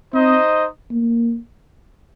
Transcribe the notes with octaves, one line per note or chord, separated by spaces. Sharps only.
C4 D#4 C5 D#5
A#3